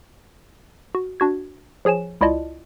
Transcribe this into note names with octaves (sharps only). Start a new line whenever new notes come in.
F#4
D4 F#4 G#6
F3 G#4 C#5 G#5 E7
C#2 E4 F4 D5 D#5 A5